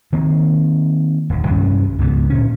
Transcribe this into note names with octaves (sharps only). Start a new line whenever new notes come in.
D#3 A#3 C4
D1 D#2
B1 G2 C3 C#4
C#2 G#2 B2 B3
A#2 D3 C#4